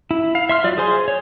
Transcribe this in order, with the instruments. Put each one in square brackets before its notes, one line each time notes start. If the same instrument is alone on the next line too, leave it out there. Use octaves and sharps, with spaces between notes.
[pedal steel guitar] E4
F5
E5 C6 F6
F#3 F4 D5
G#4 C5 G#5 C6
C#5